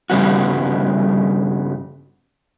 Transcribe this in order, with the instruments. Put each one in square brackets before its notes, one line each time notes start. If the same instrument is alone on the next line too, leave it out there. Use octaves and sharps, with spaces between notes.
[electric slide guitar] G2 C#3 G3 B3 F#4